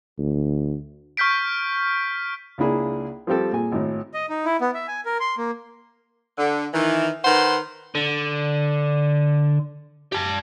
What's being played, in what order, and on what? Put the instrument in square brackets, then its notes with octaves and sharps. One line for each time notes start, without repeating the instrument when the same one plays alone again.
[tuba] D2
[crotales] C#6 F6 G6 B6 D7
[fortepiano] C#2 A#3 D4 E4 G#4
F3 G3 C4 G4 A4
A#2 G#4 G#5
G#1 A2
[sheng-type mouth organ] D#5
D#4
E4
B3
E5
G#5
A#4
C6
A#3
[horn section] D3
D#3 E3
D#3 B4 C5 F#5 C6
[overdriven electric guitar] D3
G4 A5